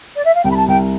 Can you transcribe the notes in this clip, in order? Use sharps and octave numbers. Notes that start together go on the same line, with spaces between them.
D5
E5
F5
C2 G5
B5
A5
C2 G5